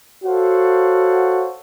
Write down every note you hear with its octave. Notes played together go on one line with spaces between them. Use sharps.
F#4 A4 C5 C#5 F5 F#5